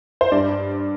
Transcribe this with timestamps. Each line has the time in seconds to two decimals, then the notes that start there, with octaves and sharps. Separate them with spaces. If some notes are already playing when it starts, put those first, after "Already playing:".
0.21 C5
0.32 G2 D5